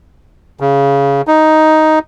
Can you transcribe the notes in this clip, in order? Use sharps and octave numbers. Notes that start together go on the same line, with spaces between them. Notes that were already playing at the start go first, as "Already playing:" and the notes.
C#3
D#4